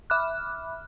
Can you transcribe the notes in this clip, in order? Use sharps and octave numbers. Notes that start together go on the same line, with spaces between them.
E5 B5 D6 F6 F#6